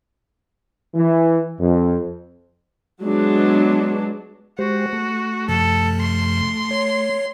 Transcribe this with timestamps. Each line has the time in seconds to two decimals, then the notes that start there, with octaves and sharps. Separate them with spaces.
0.95 E3
1.60 F2
3.02 F#3 G#3 B3 D4
4.59 G#3 F#4 G4 C5
4.93 A3
5.48 F#2 C3 F3 A4
6.00 C6
6.71 C#5